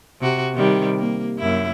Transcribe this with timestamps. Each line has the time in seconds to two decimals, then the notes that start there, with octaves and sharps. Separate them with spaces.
0.21 C3 F#4
0.54 C3 D#3 G3
0.98 A#3
1.39 F#2 A#3 E4